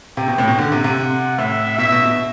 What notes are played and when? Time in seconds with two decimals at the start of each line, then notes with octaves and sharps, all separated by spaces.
0.17 C3 G5
0.28 B2
0.38 A2
0.48 B2
0.58 D3 F#5
0.72 C3
0.84 C3
1.38 A2 E5
1.78 B2 E5
1.92 B2
2.06 B2